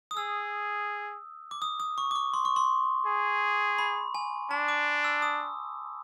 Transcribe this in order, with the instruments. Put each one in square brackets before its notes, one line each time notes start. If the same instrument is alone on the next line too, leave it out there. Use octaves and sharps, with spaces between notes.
[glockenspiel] D#6
[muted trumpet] G#4 [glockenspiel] E6
[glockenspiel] D6
D#6
D#6
C#6
D6
C#6
C6
C#6
C6
[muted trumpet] G#4
[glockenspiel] B5
G#5
[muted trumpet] D4 [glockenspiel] A5
[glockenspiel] D6
E6
D#6